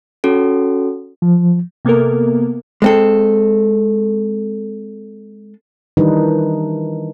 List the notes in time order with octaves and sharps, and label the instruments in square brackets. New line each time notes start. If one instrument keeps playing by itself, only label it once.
[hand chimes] C#4 F#4 A4
[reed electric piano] F3
[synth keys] C3 A#3 B3 A4 A#4
[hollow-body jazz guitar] G#3 C4 A4
[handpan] D#3 E3 G3 D4 D#4 B4